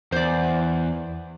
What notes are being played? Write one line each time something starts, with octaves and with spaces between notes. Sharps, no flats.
E2 C5 D5